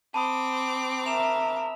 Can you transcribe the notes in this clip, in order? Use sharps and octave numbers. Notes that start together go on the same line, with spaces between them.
C4 A5 B5 D6 D#6
A#4 E5 E7 F7